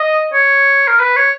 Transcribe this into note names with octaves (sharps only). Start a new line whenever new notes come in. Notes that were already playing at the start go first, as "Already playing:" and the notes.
Already playing: D#5
C#5
A#4
B4
C#5